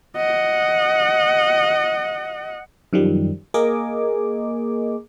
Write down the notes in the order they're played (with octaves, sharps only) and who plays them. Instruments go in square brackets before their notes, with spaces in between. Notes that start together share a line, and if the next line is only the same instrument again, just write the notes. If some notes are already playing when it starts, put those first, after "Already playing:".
[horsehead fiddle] D#5 F#5
[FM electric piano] F#2 D#3 F3 G3
A#3 G#4 A#4 D#5 G#5 D6